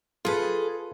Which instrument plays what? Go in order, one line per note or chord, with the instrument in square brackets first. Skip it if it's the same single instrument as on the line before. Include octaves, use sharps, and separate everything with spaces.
[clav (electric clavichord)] F4 B4 [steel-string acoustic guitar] G#4 A4